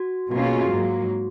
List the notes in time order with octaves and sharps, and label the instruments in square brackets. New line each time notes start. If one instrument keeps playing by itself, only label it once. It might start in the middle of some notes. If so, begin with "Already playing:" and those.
Already playing: [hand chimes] F#4
[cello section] B2 A#3 C#4 F4 [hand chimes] F#4
[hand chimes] G#4
F#4
[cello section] G#2 F#3 A#3